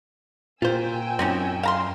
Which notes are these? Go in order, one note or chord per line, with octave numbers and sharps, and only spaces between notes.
A#2 F4 C5 G5 G#5 E6
F#2 C4 C#4 D#4
F5 A#5 C6